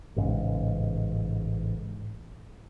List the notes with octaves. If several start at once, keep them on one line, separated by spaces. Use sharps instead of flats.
A1 G#2 C#3